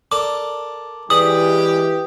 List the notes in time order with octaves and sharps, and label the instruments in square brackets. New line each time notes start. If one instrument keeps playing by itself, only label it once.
[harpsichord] A4 A#4 D5 [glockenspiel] D6
[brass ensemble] E3 G#3 G4 [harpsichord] G#4 D5 F#5 [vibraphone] B4 [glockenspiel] D#6